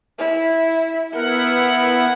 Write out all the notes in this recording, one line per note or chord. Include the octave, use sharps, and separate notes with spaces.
E4
B3 E4 A#4 F#5